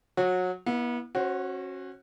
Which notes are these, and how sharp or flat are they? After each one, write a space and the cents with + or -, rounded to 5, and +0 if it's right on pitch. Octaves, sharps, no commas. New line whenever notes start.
F#3 -25 F#4 -20
B3 -35 E4 +0
C#4 -30 F#4 +0 C5 +0